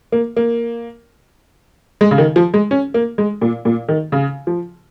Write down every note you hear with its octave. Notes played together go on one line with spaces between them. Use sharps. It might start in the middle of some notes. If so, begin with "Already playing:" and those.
A#3
A#3
G#3
C#3
D#3
F3
G#3
C#4
A#3
G#3
A#2
A#2
D#3
C#3
F3